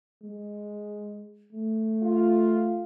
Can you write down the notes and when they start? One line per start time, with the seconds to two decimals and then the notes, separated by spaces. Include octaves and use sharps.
0.22 G#3
1.52 A3
2.03 F4